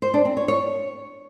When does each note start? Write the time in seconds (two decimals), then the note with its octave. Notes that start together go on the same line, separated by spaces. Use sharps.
0.02 C5
0.14 D4
0.25 C4
0.37 C#5
0.48 C#5